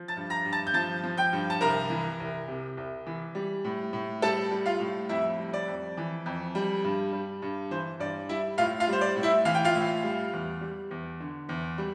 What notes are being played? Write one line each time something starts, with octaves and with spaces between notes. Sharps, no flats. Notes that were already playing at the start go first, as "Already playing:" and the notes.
Already playing: F3
A5 A6
G2
A#5 A#6
G2
A5 A6
G6
F3 A5 A6
F3
G5 G6
G2
A5
C2 A#4 A#5
E3
C2
C3
C2
E3
G3
A2
A2
G3 A4 A5
G3
F4 F5
A2
F2 E4 E5
G3
D5
F2
E3
F2
G3
G2
G3
G2
E3 C5
G2 D5
G3 E4 E5
A2 F4 F5
F4 F5
G3 C5
D5
A2
E4 E5
E3 F5
G5
F4 F5
A2
G3
E2
G3
E2
D3
E2
G3